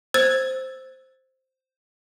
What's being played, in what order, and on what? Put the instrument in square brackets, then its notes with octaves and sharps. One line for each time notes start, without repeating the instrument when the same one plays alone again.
[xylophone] C5 E6 G#6 A6